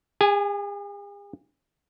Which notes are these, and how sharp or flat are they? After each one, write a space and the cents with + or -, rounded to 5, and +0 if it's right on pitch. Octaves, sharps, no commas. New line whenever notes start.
G#4 -45 G#5 +5